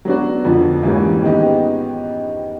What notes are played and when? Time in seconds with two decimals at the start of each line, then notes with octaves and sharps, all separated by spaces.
0.05 F#3 B3 D4 F#4
0.44 F2 D3 F3
0.83 G#2 E3 G3 A#3 C#4
1.22 D#3 G#3 B3 D#4 G4